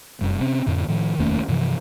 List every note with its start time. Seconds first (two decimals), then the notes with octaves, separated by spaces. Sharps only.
0.21 F1 F#2 G3
0.40 C3 C4 C#4
0.66 F2 A2 D3
0.88 A2 D#3 F3
1.18 F1 D#2 A3 C#4
1.48 G2 C3 E3 F3